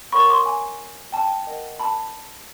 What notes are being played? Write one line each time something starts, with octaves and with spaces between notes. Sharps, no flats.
A#4 C#5 F#5 B5 C#6
C6 D6
G#5
G5 A5
A#4 D#5 F#5
A5 B5